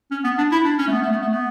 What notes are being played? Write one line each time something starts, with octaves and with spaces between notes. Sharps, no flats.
C#4
B3
D4
E4
D4
C#4
A3
B3
A3
B3
A3
B3